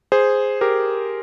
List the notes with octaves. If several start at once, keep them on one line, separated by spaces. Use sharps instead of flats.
G#4 C5
G4 A#4